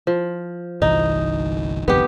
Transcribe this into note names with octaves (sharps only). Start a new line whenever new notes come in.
F3
G1 C2 E3 D#4
G1 C2 F2 B3 G4